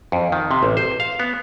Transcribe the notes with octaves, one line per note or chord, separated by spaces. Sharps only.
F2
D#3
C3
A1
C5
F5
B3